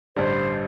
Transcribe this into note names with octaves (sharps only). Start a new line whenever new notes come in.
A1 G2 D3 G3 C5